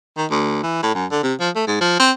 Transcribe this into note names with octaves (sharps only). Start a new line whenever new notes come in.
D#3
D2
E3
A2
F#2
D3
C3
F3
A3
G#2
F3
C4